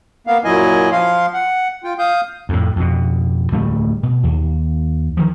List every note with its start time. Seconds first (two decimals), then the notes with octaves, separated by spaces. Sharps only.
0.27 A#3 B3 F5
0.45 F#2 A#2 F#3 E4 D#5 G#5
0.92 F3 F5 C6
1.34 F#5
1.84 F4 G5
1.99 F5 D#6 G6
2.49 F2 A2
2.76 F2 B2
3.52 D1 G3 A3
4.03 B2
4.23 D#2
5.17 D#3 F3